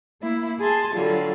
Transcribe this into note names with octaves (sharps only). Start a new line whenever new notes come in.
A#3 E4
G#4 G#5 A5 C6
D3 F#3 G3 F4